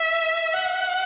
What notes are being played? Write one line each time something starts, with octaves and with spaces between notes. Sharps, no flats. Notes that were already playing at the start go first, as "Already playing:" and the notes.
Already playing: E5
F#5